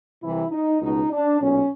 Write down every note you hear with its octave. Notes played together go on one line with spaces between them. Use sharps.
C2 C3 E3 E4
D#4
C#2 B2 D#4
D4
B1 A#2 C#4